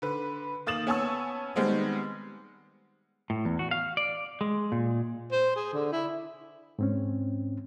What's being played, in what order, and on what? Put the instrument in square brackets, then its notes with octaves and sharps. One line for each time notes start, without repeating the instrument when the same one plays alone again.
[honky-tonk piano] D3 B4
D#3 A#3 D#6 A6 E7 F#7
B3 C#4 G#5 A5 C#6 E6
D#3 G3 G#3 B3 C4
[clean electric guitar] A2
E2
F#4
F5
D5
G#3
A#2
[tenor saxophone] C5
G#4
D3
E4
[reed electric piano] G#2 C4 C#4